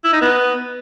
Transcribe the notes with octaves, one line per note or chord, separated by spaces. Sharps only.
E4
D#4
B3